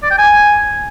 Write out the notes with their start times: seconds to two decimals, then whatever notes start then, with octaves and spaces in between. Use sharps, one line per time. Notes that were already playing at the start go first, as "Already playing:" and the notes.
0.03 D5
0.11 G5
0.18 G#5